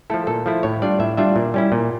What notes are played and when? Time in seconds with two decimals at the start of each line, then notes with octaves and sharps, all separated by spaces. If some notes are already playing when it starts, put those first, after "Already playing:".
0.10 F3 A3 E4 A4
0.27 A#2 A4
0.46 F3 A3 E4
0.63 A2 C#5
0.82 G3 D4 F4 D5
0.99 A2 E5
1.17 G3 D4 F4 E5
1.36 A#2
1.54 G3 C#4 E4
1.72 A#2